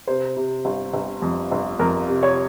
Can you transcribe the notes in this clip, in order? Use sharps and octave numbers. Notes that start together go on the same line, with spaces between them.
C3 C5
C3
G1
G1
F2
G1
F2 A#4
C3
C#5